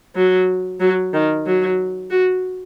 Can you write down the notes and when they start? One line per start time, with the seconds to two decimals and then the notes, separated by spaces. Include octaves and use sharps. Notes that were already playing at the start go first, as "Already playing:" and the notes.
0.16 F#3
0.80 F#3
1.13 D#3
1.46 F#3
2.11 F#4